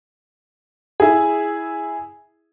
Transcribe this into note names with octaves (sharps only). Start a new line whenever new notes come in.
E4 G#4